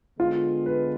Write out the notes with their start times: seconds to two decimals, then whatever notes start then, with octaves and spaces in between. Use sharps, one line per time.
0.19 D3 G#3 B3 F4
0.66 B4